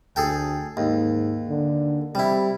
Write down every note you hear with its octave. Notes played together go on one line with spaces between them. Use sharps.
D2 G#4 A4 G5
D#2 G#2
D3
C3 G3 E4